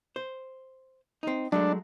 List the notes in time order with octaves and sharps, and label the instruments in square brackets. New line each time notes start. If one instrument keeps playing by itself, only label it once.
[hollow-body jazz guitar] C5
C4 D#4
[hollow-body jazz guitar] F#3 G#3 A3 [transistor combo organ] D4